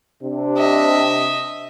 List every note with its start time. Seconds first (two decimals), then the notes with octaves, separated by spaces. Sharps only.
0.22 C3 D4
0.58 D#5 E5